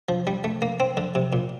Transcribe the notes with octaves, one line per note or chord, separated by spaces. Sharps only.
F3
G3
A3
A#3
C4
D3
C3
A#2